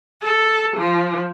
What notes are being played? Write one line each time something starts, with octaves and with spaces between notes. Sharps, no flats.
A4
F3